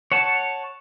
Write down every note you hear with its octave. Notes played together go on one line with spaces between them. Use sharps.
C#5 F#5 A5